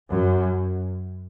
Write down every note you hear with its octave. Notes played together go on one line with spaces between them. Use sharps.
F#2